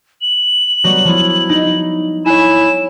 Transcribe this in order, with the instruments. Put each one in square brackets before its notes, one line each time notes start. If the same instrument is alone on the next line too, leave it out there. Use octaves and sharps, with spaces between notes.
[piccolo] F#7
[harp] F#3 G3 B3
[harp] F3 B3 [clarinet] E4
[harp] D#4
[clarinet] E4 [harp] C#5 G#5 [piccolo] E7